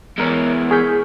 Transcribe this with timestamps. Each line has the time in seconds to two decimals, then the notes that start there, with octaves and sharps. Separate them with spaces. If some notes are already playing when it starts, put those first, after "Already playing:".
0.18 E2 G#3 A#4 C#5
0.71 G#4 C#6 F6 G6 B6